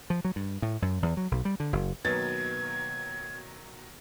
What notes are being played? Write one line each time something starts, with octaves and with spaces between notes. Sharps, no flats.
F3
F#3
G2
A2
F#2
E2
F#3
B1
G3
D3
F#1
B2 D#3 F#3 A#3 G#6 A6